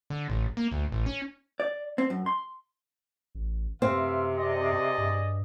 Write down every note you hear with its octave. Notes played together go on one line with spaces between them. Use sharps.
D3
A1
A#3
D2
A1
C#4
D5
C4
F#2
C6
A1
F#2 C3 C4 B4 E5 F5
G#4 D5 D#5
G2